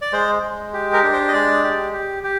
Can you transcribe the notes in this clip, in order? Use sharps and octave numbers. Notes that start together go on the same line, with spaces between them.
D5
G#3 C5
G#3
G4
A#4
D4
C5
D#5
G#3 D5
G4
G4
G4